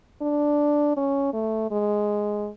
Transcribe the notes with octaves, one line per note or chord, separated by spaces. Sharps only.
D4
C#4
A3
G#3